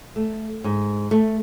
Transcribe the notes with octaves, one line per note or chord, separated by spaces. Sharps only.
A3
G#2
A3